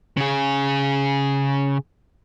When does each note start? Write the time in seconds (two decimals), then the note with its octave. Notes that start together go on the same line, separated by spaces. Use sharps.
0.17 C#3 G#4